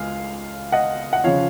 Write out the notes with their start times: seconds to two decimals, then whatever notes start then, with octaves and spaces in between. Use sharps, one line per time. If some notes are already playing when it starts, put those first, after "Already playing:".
Already playing: C#2 G#3 F5 G#5
0.72 D#5 F#5
1.13 F#5
1.24 C#3 F3 C#5 F5